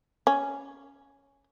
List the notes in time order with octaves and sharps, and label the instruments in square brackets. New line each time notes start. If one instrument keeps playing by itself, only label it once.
[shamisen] C#4